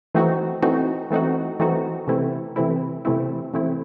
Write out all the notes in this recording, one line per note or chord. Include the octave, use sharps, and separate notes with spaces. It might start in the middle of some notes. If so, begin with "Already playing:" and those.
E3 A3 C4 D#4 F#4
E3 A3 C4 D#4 F#4
E3 A3 C4 D#4 F#4
E3 A3 C4 D#4 F#4
C3 E3 A3 C4 E4
C3 E3 A3 C4 E4
C3 E3 A3 C4 E4
C3 E3 A3 C4 E4